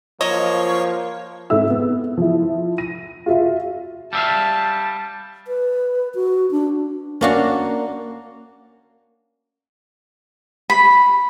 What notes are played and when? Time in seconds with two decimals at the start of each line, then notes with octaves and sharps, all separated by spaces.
0.21 F3 F#3 A#3 C#5 D#5
1.50 G#2 C4 A4 E5 E6
1.69 B3
2.17 F3 E4
2.78 A#6 D#7
3.26 F4 F#4 E5 F5
4.13 G3 E5 F5 A5
5.48 B4
6.15 F#4
6.51 D4
7.21 A#3 C#4 D4 F#4 F5
10.70 B5